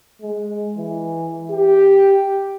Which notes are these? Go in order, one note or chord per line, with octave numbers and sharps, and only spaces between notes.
G#3
E3
G4